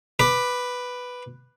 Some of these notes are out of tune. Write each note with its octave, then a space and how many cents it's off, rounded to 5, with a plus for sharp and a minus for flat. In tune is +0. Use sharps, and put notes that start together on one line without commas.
B4 +0 D6 +15